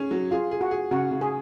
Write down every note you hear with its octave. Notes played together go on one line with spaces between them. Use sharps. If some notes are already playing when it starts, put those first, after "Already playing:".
Already playing: C#4 G#4
F#3
F4 G#4
G#4
F#4
G#4
C#3 F#4
C#3
G#4